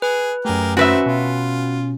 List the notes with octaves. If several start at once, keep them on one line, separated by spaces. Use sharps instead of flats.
G#4 B4
F#2 A3 G4 G#4 A#4
D#3 C4 C#4 F#4 B4 E5
B2 F4